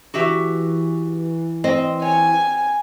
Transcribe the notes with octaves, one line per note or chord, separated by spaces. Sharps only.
E3 F#4 G4 E5
C4 D#5
C#5 G#5